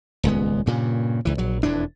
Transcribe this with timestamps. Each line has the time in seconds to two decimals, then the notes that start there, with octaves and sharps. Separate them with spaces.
0.24 D#1 C#2 G#3 B3
0.66 G2 A#2 C#3
1.25 C#2 E3
1.38 A#1 F#3
1.63 E1 F2 E3 D4